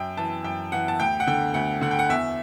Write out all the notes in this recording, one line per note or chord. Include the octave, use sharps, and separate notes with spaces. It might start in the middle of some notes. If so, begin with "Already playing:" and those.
Already playing: F#2 G5
E3 A5
F#2 G5
E3 F#5
A5
D2 G5
F#5
D3 G5
D2 F#5
D3 F#5
G5
F#5
E2 E5